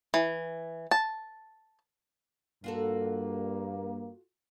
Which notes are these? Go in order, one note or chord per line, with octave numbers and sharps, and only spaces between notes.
E3
A5
G2 A#3 F4 F#4 A4